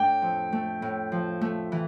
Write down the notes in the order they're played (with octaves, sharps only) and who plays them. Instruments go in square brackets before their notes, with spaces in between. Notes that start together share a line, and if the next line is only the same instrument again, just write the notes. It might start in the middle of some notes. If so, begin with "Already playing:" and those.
Already playing: [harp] A2 D4 [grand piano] G5
[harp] F2
A3
A2
F3
A3
E3